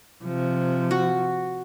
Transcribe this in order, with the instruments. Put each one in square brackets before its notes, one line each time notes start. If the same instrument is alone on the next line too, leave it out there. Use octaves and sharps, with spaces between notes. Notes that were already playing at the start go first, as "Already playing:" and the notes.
[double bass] C3 F3
[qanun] F#4